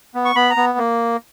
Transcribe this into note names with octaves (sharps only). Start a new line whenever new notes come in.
B3
C#6
B3 B5
A#5
B3
A#3